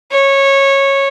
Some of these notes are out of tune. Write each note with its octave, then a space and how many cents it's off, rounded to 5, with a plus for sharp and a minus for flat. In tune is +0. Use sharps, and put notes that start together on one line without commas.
C#5 -15